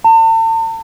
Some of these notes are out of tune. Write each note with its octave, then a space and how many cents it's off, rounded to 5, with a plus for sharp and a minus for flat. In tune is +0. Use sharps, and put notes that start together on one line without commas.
A5 +40